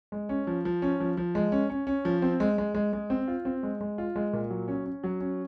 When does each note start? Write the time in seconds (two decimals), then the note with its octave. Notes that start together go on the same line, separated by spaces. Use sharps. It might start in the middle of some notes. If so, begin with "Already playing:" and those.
0.12 G#3
0.29 C#4
0.47 F3
0.65 F3
0.82 C#4
1.00 F3
1.17 F3
1.35 G#3
1.52 C#4
1.70 C#4
1.87 C#4
2.05 F3
2.22 C4
2.40 G#3
2.58 G#3
2.74 G#3
2.93 G#3
3.10 C4
3.28 F4
3.45 C4
3.63 G#3
3.81 G#3
3.98 F4
4.16 G#3
4.33 A#2
4.50 F#3
4.68 C#4
4.86 C#4
5.04 F#3
5.21 C#4